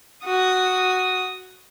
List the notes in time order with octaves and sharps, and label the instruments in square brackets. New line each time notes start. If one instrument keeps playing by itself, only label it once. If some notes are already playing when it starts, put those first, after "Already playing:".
[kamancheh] F#4 D#6